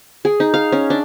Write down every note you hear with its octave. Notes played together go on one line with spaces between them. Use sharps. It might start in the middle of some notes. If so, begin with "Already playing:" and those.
G#4
D#4
F5
C#4
D4